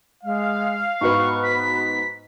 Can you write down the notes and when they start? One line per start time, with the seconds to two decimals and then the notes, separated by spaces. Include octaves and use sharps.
0.24 G#3 F5
1.01 G#2 B3 F#4 B4 C#6
1.43 B6